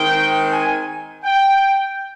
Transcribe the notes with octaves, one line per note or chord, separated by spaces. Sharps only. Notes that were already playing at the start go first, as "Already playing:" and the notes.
Already playing: D#3 G#3 C4 G5
G#5
G5